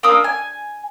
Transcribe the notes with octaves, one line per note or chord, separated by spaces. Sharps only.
A#3 D4 D#6 E6
G#5